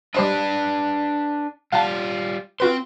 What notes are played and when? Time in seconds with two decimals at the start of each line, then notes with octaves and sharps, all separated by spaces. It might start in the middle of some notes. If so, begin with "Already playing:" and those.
0.14 G3 D4 B4 C5 D#5
1.72 G3 F4 F5 F#5 A5
2.60 C4 F4 F#4 B4 C6